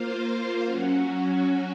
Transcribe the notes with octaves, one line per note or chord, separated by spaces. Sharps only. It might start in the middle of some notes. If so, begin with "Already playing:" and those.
Already playing: A#3 F4 C5 F5
F#3 C#4 F#4